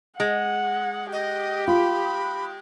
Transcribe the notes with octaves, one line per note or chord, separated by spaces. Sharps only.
G#3 F#5
G4 D#5
F4 B5